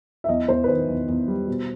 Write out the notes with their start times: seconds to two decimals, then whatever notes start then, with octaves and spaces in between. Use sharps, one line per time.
0.24 E5
0.28 E2 D#5
0.48 E2 C5
0.64 B4
0.68 D#3 C5
0.88 E2
1.08 E2
1.28 G3
1.48 B2